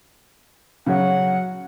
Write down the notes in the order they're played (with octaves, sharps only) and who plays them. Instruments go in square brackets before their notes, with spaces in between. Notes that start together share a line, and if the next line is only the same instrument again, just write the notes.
[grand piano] C#3 F#3 C#5 [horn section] F#5